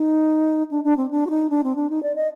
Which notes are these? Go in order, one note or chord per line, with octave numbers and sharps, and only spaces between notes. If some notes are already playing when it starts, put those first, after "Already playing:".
Already playing: D#4
D4
D4
C4
D4
F#4
D#4
D4
C4
D4
D#4
D5
D#5